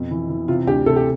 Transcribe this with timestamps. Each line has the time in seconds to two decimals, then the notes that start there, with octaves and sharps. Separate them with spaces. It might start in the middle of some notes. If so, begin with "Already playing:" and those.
Already playing: F2 B2
0.11 E3
0.29 E3
0.48 C3 F4
0.67 D2 G4
0.86 C3 A4
0.96 G4